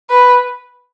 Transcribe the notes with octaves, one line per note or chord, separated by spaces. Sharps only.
B4